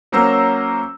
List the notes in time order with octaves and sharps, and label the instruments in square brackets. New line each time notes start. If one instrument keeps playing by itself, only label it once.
[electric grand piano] F#3 A#3 C#4 C5 A#5 E6